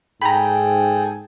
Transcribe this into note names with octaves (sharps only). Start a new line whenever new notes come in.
G#2 G#4 A4 G5 A#5 B5